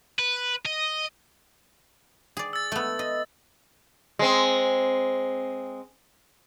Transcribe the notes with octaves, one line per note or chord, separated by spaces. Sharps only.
B4
D#5
G#4 D5
E6 A6
A3 B3
D#5
G#3 C4